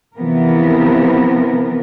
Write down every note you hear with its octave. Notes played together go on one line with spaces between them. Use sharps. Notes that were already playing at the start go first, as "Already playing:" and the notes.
C3 E3 F3 B3 A#4